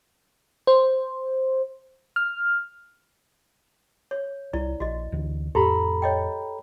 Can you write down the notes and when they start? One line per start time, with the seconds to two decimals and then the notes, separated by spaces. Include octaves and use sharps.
0.67 C5
2.16 F6
4.11 C#5
4.53 C2 E4 D5
4.80 A#1 F#4 D#5
5.12 D2 D3 E3
5.55 F2 A2 G4 A4 A#5 B5
6.02 C#5 D#5 G5